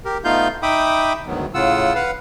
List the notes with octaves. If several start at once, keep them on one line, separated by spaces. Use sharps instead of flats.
G4 A#4
A3 B3 D#4 F4 F5 G6
D#4 E5 G5 B5 D6 D#6
D2 G#2 D#3 F#3 B3
A2 C#3 F4 F#5 E6
B4 F5 F#5